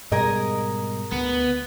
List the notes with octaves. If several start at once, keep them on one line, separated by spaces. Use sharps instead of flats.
G#2 B2 G3 G#4 A#4 D#5
D2 B3